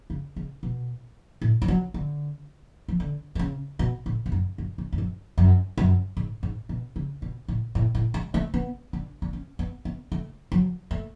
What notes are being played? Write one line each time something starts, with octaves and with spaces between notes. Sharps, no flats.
C#3
C#3
B2
A2
F3
F#3
D3
F3
D3
D3
C#3
B2
A2
G#2
F#2
F#2
G#2
F2
F#2
F#2
F#2
G#2
G#2
B2
C#3
B2
A2
A2
A2
G#3
A3
B3
D4
D4
C#4
B3
B3
A3
F#3
A3